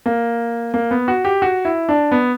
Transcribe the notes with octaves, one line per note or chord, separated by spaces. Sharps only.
A#3
A#3
B3
F#4
G4
F#4
E4
D4
B3